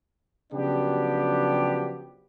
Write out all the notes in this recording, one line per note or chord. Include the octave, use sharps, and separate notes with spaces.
C#3 F3 F#3 B3 D4 G4